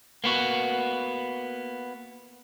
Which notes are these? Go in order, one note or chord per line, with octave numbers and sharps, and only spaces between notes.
A#3 B3 F#4